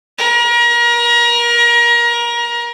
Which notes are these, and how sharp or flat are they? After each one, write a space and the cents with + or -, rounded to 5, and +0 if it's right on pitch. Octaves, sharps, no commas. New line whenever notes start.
A#4 +30